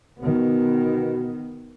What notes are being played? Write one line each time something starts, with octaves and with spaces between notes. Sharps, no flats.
B2 D#3 B3